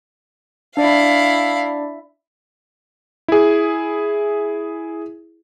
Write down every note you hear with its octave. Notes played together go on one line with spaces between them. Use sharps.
D4 E4 D5 F5
E4 G#4